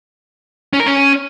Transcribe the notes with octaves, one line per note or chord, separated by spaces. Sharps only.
C#4
A#4
C#4